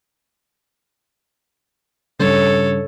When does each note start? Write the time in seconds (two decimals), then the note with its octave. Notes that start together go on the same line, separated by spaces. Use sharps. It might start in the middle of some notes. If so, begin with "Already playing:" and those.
2.19 G2 C#3 A4 C#5